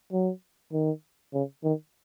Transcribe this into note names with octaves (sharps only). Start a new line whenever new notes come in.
F#3
D#3
C#3
D#3